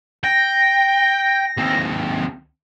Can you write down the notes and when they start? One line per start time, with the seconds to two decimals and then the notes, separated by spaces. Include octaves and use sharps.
0.24 G5 A#6
1.57 D#2 C4